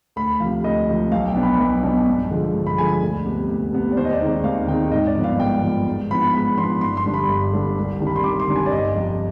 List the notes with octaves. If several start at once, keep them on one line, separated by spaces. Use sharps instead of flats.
D2 B5
C3 F3 F5
D2 D#5
C3 F3
B1 F5
G5
B2 B3 D4
B5
B1
B2 B3 D4
G2
D3 F3 G#3
G2
B5
D3 F3 G#3 G#5
D2
C3 G3 B3
D2
C3 G3 B3
D5
D#2 C5
D#5
D5
D#3 G#3 C4 D#4
D#2 F5
D#3 G#3 C4 D#4 G5
G#1 D#5
D5
G2 F3 B3
F5
G#1 G5
G2 F3 B3
G#2
F3 B3 D4 B5
G#2 B5
F3 B3 D4 C6
G1 C6
C6
G2 D3 G3 D4
B5
G1
G2 D3 G3 D4
C2
C3 D#3 G3 D4
B5
C6
C2 D6
C6
C3 D#3 G3 D4
G#5
D5
G1 D#5
F2 C3